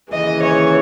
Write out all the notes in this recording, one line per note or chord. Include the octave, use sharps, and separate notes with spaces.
D#2 C#3 E3 D#5
C#5